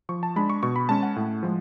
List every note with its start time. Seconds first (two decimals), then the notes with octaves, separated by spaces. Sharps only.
0.09 F3 C#6
0.23 A5
0.36 G#3 D4 B5
0.50 C#6
0.63 B2 C#6
0.76 B5
0.89 G#3 C#4 A5
1.03 F#5
1.16 A2
1.43 F3 G#3